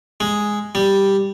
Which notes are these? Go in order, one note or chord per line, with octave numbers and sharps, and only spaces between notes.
G#3
G3